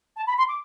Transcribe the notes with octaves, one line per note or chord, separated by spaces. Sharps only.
A5
B5
C6
D6